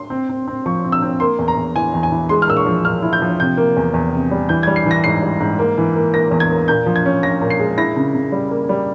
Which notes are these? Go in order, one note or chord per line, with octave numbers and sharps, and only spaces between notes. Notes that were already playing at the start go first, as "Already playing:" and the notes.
Already playing: C6
C4
C4
C4
F3 C#6
C4
E6
C4
A#3 C6
E2
A#5
E2
E3 G#5
E2
G#5
E3
G#3 C6
F6
A#2 E6
C#6
F3
A#2 F6
E4
G6
F3
C3 G6
A#3
E2
E2
C3
G3
E3 G6
G3 G#6
C7
E3 A#6
G#2 C7
G3
G#2
A#3
E3
A#3
A#3 A#6
E2
G#6
A#3
A#2 G6
F3
G#6
C#4
F3 A#6
A#2
C7
G#3
E4 A#6
C#3
C#3
G3
A#3
G3